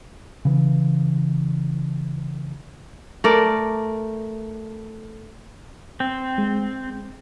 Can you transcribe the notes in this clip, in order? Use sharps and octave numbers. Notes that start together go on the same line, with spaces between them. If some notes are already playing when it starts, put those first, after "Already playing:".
C#3 E3
A3 A#4 D5
C4
G#3